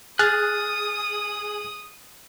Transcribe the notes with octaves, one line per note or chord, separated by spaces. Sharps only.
G#4 D#6 F6 F#6 A6